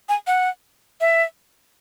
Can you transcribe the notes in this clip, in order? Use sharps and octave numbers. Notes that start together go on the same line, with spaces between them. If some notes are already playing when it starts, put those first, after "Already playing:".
G#5
F#5
E5